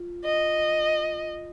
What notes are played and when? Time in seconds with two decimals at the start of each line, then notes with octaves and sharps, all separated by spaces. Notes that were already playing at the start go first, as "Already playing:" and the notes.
Already playing: F4
0.24 D#5